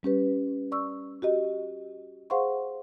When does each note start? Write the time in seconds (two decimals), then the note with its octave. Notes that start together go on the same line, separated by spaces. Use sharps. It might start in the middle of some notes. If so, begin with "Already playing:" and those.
0.03 G3 C#4 G4 B4
0.72 D5 C#6 E6
1.22 F#4 G4 D#5
2.30 G#4 C5 F5 F#5 C6 C#6